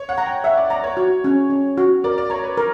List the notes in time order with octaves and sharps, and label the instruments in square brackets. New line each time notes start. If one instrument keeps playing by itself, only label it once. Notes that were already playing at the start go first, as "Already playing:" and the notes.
Already playing: [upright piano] C#5
F#5
[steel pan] A#5
[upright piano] G5
[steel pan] E5 [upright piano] F#5
[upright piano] D5
[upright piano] D5 [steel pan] A#5
[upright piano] C#5
[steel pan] F#4
C#4
C#4
F#4
[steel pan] A#4 [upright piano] D5
[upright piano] D5
[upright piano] C#5 [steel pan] A#5
[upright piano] B4
[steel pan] A#4